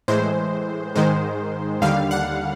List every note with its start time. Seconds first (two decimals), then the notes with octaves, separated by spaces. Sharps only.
0.08 A2 E3 G#3 C5
0.96 G#2 D#3 G#3 C5
1.82 D#2 D3 G3 F5
2.11 F#5